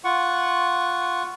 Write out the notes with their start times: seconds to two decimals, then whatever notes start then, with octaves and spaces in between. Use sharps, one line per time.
0.04 F4 F#5 C#6